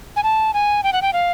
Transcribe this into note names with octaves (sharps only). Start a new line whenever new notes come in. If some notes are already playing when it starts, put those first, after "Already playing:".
G#5
A5
G#5
G5
F#5
G5
F5